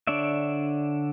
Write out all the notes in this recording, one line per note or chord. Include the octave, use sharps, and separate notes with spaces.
D3 D4 C#5 D5 E5